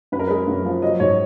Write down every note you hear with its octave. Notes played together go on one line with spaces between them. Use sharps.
F#2 B4
A#4
G#3 B4
F#2
F3
F#3 D#5
G#2 C#5